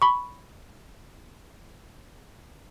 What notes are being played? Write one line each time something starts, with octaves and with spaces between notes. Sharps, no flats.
B5 C#6